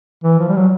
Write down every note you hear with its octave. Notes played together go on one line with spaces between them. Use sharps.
E3
F3
G3
F#3